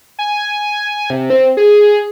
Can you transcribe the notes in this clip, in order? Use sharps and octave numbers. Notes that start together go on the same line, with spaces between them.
G#5
C3
C4
G#4